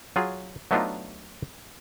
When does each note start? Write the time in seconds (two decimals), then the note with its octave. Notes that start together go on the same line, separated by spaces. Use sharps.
0.16 F#3 F4 G#4
0.71 F#3 A3 B3 D4 D#4 F4